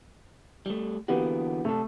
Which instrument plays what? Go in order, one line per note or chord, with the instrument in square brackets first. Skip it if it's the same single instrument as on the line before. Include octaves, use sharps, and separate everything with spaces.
[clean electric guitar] G3 A3
[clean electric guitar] D3 E3 F#4 [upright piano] A#3 B3 G4
[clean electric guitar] C3 A4 [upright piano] A3